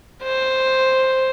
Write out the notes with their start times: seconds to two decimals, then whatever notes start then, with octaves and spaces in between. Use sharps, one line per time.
0.23 C5